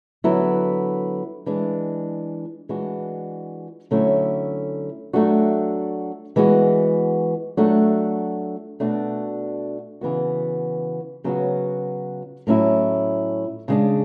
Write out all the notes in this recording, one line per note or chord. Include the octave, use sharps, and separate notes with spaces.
D3 F#3 B3 E4
E3 G#3 D4
E3 G#3 D4 F#4
D3 F#3 A3 C#4 E4
F#3 A3 D4 F#4
E3 G#3 B3 F#4
F#3 A3 D4 F#4
B2 A3 D4 F#4
C#3 E3 B3 F#4
C#3 F#3 B3 F#4
A2 F#3 C#4 E4
C#3 G#3 D4